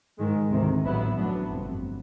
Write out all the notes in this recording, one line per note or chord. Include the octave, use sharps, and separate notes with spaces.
G#2 D#3 G#3
D2 C3 D#3
A1 A2 F#3 B3 E4
A2 F#3 B3 D4
G1 F2 C3